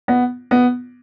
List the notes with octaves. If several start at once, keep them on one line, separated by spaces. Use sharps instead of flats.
B3
B3